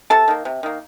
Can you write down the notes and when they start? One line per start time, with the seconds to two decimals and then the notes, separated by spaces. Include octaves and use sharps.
0.10 C3 A4 A5
0.28 D#3 A#3
0.45 C3
0.63 D#3 A#3